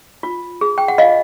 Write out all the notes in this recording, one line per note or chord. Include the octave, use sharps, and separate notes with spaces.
F4
G#4
G5
F#5
F4 D#5 F5